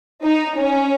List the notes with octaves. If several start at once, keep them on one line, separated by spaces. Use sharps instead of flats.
D#4
C#4